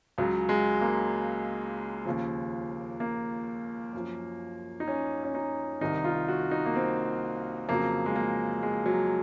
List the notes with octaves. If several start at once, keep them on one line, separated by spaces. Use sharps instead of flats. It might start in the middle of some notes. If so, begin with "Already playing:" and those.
C#2 C#3 F#3
G#3
A#3
D#2 C#3 F3
A#3
F#2 F3
D#4
C#4
C#4
D#4
C2 C3 D#3 D#4
F4
F#4
D#4
A#3
C4
F2 C#3 F#3 A#3
G#3
A#3
G#3
F#3